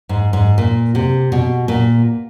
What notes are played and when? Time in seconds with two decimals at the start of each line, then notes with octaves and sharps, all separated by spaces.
0.09 G#2
0.33 G#2
0.58 A#2
0.95 C3
1.32 B2
1.68 A#2